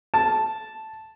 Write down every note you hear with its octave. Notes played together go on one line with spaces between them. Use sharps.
A5